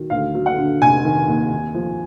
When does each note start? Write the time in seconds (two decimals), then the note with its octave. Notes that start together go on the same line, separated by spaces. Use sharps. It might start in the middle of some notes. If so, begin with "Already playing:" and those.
Already playing: D#3 F#3
0.10 D2 F5
0.34 F#3
0.46 F#5
0.58 D3
0.81 F1 G#5
1.05 D#3
1.28 D#2
1.52 D#2
1.74 F3